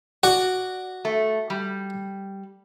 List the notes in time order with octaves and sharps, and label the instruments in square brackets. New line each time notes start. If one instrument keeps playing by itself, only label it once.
[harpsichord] F#4 [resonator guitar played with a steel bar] D5
[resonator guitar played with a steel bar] A3
G3